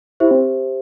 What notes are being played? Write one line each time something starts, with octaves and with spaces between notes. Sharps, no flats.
E4 G4 C5 E5
C4